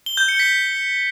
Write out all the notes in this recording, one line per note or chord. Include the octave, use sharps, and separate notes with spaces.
G7
G6
C#7
B6